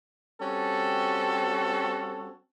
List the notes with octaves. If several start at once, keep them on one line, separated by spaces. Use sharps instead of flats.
G3 C4 C#4 F#4 A4